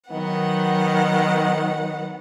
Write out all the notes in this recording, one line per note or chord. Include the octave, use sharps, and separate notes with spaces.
D#3 F#3 B3 F#5